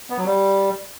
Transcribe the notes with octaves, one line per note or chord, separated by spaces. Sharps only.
B3
F#3
G3